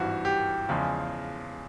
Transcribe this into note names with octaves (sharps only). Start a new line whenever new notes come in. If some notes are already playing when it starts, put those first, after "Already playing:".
Already playing: G#1 G2 E3 F#4
G4
E2 C#3 F3 G#3